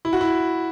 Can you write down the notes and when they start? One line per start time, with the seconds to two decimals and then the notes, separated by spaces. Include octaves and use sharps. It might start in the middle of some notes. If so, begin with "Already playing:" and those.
0.05 E4
0.13 F#4
0.21 E4